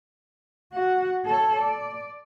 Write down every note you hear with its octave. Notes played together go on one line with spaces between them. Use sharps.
F#4 F#5
A4 C#5
D5